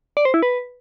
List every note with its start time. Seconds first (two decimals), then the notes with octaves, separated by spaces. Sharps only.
0.17 D5
0.25 C5
0.34 E4
0.42 B4